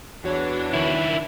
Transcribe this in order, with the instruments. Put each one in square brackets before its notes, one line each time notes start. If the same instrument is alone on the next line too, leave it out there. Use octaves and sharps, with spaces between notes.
[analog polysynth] E2 F#4 C#5 [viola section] E3 D4
[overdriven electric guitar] D#3 E4